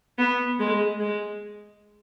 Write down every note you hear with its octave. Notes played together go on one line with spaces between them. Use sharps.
B3
G#3
G#3